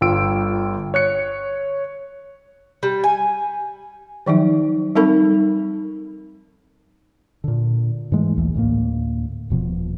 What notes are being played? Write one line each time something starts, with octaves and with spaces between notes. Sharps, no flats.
G1 F4 G5 E6 D7
C#5 F#6 C#7
G3
G#5
D#3 F3 F#3 D#4
G3 C4 D#4 A4 A#4 B5
A#2 D3
G#2 E3 G#3 A3
A#1 D#2 E3
D2 A2 A#3
D#1 B2 F3